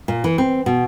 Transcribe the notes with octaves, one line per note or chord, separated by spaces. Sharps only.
A#2
E3
C4
B2